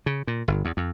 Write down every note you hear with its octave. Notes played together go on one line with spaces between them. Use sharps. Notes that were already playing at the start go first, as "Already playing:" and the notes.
C#3
A#2
G1
E2
F2